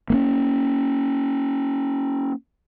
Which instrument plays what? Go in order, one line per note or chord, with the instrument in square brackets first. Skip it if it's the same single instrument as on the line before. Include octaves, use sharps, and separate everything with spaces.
[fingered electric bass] A#3 B3 C#4